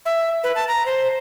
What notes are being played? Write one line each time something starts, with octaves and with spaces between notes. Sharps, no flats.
E5
B4
A5
A#5
C5